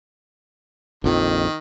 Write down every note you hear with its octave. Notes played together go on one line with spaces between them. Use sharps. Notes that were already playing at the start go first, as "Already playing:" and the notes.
A#1 F2 D#3